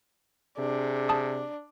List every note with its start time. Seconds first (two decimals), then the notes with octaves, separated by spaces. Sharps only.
0.58 C3 D4 G#4
1.09 A5 D#6